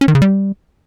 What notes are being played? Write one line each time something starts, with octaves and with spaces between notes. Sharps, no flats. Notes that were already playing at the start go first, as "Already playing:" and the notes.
C#4
D#3
C#3
G3